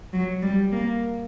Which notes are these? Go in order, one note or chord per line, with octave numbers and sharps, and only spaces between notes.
F#3
G3
A#3